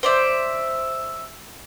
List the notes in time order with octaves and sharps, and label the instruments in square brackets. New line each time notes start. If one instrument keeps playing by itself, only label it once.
[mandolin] C5 D5 E5